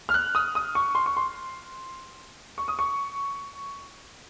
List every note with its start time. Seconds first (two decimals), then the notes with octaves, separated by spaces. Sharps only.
0.09 F6
0.14 F#6
0.35 D#6
0.55 D#6
0.75 C#6
0.95 C6
1.06 C#6
1.17 C6
2.58 C#6
2.68 D#6
2.79 C#6